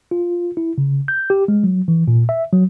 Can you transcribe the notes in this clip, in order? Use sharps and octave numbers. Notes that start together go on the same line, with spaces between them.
F4
E4
C#3
G6
G4
G#3
F#3
E3
A#2
E5
F#3